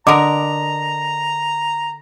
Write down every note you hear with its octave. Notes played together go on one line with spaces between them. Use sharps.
D3 A#4 D#5 A#5 D6